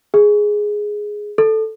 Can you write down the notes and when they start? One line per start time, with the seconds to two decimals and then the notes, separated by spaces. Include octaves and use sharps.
0.14 G#4
1.38 A4